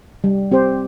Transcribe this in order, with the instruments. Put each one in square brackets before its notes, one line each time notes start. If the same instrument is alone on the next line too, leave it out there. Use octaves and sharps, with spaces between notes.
[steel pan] G3
C4 G4 C5